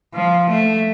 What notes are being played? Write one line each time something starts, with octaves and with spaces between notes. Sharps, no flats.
F3
A3